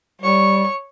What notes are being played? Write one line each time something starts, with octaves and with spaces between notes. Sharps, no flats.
G3 C#5 C#6